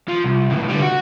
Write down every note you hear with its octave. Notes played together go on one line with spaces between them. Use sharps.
F3
C2
C#2 A2
D3 G3
F#4